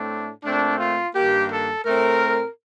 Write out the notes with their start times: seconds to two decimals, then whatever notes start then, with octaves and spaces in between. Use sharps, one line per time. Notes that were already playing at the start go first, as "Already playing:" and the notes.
Already playing: A2 A3 C4 D4
0.44 A#2 A3 C4 D4
0.79 F4
1.14 G2 D#3 A#3 G4
1.50 A4
1.85 A2 A3 C4 A#4